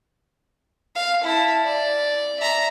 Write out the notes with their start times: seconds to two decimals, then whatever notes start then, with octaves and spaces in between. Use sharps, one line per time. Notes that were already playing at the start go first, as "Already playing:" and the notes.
0.95 F5
1.24 E4 A5
1.65 D5
2.40 E5 A#5